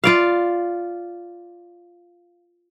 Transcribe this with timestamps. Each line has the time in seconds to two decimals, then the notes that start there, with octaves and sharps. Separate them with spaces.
0.04 F4 D5 F5